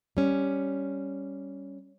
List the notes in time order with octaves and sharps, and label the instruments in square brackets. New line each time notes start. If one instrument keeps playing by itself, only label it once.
[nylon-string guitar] G3 C#4